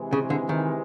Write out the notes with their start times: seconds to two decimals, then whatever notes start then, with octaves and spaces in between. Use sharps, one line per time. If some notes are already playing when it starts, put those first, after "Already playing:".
Already playing: C3 E3 G#3
0.13 C#3
0.30 D3
0.49 D#3